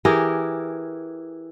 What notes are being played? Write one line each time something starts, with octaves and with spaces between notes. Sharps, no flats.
E3 G4 G#4 A#4